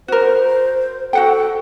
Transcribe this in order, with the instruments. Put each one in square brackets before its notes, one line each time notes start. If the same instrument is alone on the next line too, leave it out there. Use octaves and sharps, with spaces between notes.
[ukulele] F#4 A#4 [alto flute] C5
[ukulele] F#4 F#5 G5 [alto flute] A4